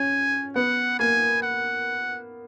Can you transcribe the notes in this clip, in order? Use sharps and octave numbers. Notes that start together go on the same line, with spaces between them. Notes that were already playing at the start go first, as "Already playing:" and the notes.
Already playing: C#4 G#5
B3 F#5
A#3 G#5
F#5